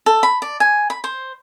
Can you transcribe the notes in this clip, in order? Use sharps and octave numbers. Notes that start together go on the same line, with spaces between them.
A4
B5
D5
G#5
B5
C5